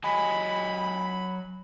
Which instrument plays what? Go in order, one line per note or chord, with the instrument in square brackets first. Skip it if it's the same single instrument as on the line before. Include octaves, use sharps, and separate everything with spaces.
[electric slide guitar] F#3 D#5 G#5 [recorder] B5